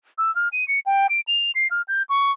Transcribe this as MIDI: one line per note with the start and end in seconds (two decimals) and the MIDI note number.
0.18 0.34 88
0.35 0.48 89
0.52 0.67 99
0.68 0.80 97
0.86 1.07 79
1.09 1.20 98
1.27 1.51 101
1.55 1.68 96
1.71 1.82 89
1.88 2.03 91
2.09 2.32 85